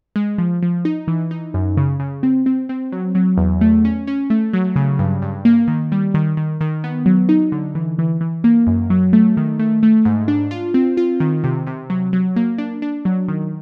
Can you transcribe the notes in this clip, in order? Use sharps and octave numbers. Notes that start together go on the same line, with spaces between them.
G#3
F3
F3
D#4
E3
D#4
F#2
C#3
C#3
C4
C4
C4
F#3
F#3
E2
A3
C#4
C#4
A3
F#3
C#3
G2
G2
A#3
D#3
G3
D#3
D#3
D#3
B3
F#3
D#4
D3
E3
E3
E3
A#3
F#2
F#3
A3
D#3
A3
A3
G#2
D4
F4
C4
F4
D#3
C3
C3
F#3
F#3
A#3
D4
D4
F#3
D#3